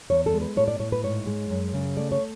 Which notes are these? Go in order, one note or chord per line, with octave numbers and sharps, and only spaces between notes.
E2 C#5
A4
G#3
B4
A2 C#5
D5
A2 C#5
B4
G#2 C#5
G#3
F#2
C#3
A3 D5
C#5